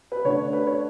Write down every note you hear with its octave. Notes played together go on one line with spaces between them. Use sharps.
B4
D3 A3 D4 C#5
B4
C#5